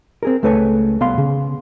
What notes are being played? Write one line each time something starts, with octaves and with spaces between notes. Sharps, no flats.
C4 G#4 A#4
C#2 A3 A4 B4 C#5 G#5
C2 B3 F5 C6
C#3